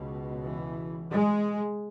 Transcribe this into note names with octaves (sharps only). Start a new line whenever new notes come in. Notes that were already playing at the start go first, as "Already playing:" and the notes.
Already playing: C#2 B2
E3
G#3